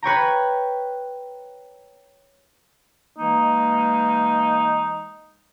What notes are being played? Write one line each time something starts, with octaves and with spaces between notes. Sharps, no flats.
B4 C#5 G5 A#5
E3 G#3 A#3 D#4